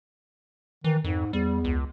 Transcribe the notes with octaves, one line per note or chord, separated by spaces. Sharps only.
D#3 E3
F2 G#2
E2 G3
C#2